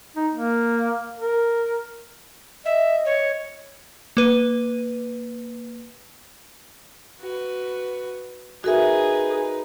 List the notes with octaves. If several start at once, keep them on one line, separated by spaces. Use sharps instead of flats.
D#4
A#3
A#4
D#5 E5
C#5
A#3 B4 D#7
F#4 B4
D#4 F#4 G#4 A#4 B4 E5